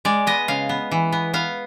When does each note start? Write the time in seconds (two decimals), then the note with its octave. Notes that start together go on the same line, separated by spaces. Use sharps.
0.05 G#3 D5
0.27 B3 D#5
0.48 C#3 F5
0.69 B3
0.91 E3
1.12 B3
1.34 B3 F5